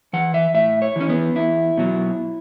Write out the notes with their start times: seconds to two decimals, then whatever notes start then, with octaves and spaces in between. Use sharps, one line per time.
0.13 E3 F#5
0.34 E5
0.54 A2 E5
0.82 C#5
0.96 E3 C#4
1.09 B3
1.36 E2 E4
1.77 B2 F#3